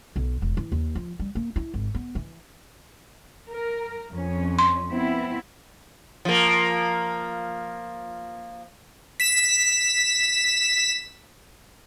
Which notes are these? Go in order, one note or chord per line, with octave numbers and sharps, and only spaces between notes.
B1
E1
E3
D#2
F3
G3
A#3
E4
G#1
B3
E3
A#4
F2 C#4
C6
B3 C4 E4
F3 A#3
B6 E7